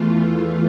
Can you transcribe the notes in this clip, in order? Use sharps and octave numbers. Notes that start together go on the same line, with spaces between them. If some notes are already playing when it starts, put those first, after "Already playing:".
Already playing: E2 E3 A3 F4